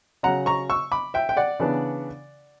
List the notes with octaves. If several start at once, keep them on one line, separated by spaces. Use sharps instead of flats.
C#3 F#3 C#4 F#5 A#5
A#5 C#6
C#6 E6
B5 D6
E5 G5
G5
D5 F#5
C#3 E3 B3 D4